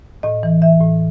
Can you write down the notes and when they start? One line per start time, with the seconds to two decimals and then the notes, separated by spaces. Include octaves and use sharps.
0.23 A2 D#5
0.43 E3
0.62 E3 E5
0.80 A2